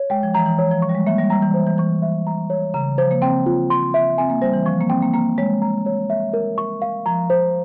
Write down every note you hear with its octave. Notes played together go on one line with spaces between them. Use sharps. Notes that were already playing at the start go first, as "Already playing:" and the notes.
Already playing: C#5
G#3 G5
F3
E3 A#5
E3
C#5
F3
C#6
G3
G#3
A#3 E5
G3
G3 A#5
E3
C5
E3
E3 C#6
E5
A#5
C#5
C#3 A#5
F3 C5
A#3
C4 G5
F4
C6
E5
C4 G#5
A#3
G3 C5
E3
F3 C#6
A#3
C4 G5
A#3
A#3 A#5
G#3 C#5
A#5
C#5
E5
A#4
C#6
F5
F3 A#5
C5